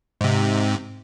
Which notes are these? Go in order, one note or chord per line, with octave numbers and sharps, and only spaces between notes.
G#2 C3